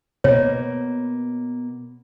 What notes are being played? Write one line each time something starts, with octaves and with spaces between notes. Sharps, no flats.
B2 A#3 C#5